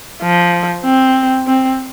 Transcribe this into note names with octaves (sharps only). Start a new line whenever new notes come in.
F3
C4
C4